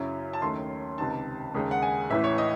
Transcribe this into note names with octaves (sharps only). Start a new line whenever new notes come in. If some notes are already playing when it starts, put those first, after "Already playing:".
Already playing: F#2 C#3 F#3 C#4 E4
A5
D#2 D#3 A3 C#4 C6
C#2 C3 D#3 A5
D#2 C#3 G#3 D#4
F#5
G#5
A1 A2 E3 E5
C#5
D#5